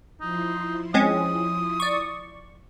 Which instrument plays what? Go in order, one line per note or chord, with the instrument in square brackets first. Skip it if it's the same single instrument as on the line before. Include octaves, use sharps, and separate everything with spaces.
[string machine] F3 E4 C6 [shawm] D#4
[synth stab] G#3 C4 C#4 [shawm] D#6
[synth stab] D5 C#6